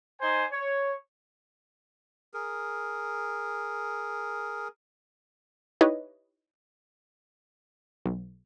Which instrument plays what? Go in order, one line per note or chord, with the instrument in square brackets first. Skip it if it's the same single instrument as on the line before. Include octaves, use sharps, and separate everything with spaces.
[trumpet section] D#4 C5 G#5
C#5
[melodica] G#4 A#4
[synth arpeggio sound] D#4 E4 G4 B4 C#5 D#5
B1